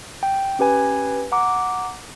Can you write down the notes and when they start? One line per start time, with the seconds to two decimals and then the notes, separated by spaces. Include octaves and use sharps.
0.23 G5
0.59 C#4 G4 B4 G#5 G#6
1.32 F#5 A#5 D6